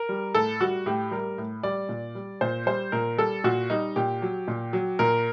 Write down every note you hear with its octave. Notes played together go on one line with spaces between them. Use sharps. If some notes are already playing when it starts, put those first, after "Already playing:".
Already playing: A#4
G3
A2 A4
G3 F#4
A2 G4
G3 A#4
A2
G3 D5
A#2
G3
A#2 C5
G3 C5
A#2 A#4
G3 A4
A#2 F#4
G3 D#4
A#2 G4
F#3
A#2
F#3
A#2 A#4